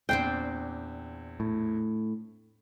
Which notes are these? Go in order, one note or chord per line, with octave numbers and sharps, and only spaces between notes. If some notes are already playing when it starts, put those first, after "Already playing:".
E2 A#2 C4 D4 C5 G5
A2